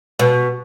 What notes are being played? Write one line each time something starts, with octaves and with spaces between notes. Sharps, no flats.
B2